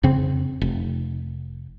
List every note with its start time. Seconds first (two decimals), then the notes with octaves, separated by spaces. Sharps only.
0.03 F2 C#3 C4
0.61 F1